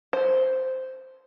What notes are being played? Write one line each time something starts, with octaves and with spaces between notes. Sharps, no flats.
C5